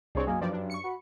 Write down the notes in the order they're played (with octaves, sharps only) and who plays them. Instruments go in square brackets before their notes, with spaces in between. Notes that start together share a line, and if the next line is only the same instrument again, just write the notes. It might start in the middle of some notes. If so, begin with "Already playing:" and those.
[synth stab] C2 C4 [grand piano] D4 G#4 C#5
[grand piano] F#2 [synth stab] A#3 [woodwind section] D#5 F5 G#5
[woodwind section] G2 [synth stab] F3 D5
[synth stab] D4
C#6 C#7
[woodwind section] F#4 B5